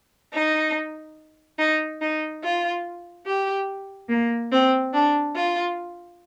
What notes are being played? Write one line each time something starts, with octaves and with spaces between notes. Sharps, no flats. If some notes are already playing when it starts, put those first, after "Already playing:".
D#4
D#4
D#4
F4
G4
A#3
C4
D4
F4